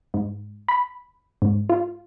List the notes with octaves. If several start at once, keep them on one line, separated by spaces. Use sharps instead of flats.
G#2
B5
G#2
F4